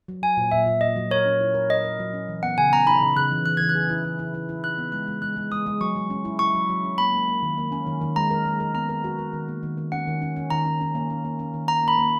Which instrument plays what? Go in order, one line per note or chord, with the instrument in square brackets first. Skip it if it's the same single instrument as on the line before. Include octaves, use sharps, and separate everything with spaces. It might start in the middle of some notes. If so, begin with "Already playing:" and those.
[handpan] F#3
[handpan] F#3 [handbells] G#5
[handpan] A#2
[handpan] A#2 [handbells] E5
[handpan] A#2
[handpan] A#2 [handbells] D#5
[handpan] F#3
[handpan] A#4 [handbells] C#5
[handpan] C#4
E4
A#4
[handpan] A#4 [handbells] D#5
[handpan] A#4
F#3
C#4
E3
[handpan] B3 [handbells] F#5
[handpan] C#3 [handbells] G#5
[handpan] B3 [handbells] A#5
[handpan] D#4 [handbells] B5
[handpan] C#3
[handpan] C#3 [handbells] F#6
[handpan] E3
[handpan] E3 [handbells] F#6
[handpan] E3 [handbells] G#6
[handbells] F#6
[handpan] G#4
E4
E4
E4
E4
E4
[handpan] D#4 [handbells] F#6
[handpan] B3
[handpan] G#3 [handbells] F#6
[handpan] G#3
[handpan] G#3 [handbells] F#6
[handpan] G#3
[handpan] G#3 [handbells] D#6
[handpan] G#3
[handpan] F#3 [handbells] C#6
[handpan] F#3
C#4
E4
[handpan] E4 [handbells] C#6
[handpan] F#3
F#3
C#4
[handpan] A#3 [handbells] B5
[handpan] A#3
A#3
D#3
A#3
C#4
D#3
D#3
[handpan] G#3 [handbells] A#5
[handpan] A#4
G#3
A#4
[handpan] B3 [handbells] A#5
[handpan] A#4
F#4
A#4
D#3
A#3
D#3
D#3
[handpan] C#4 [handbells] F#5
[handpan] D#3
C#4
C#4
[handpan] D#3 [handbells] A#5
[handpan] C#4
C#4
A#3
C#4
A#3
C#4
D#3
[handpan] D#4 [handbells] A#5
[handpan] A#3 [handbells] B5
[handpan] A#3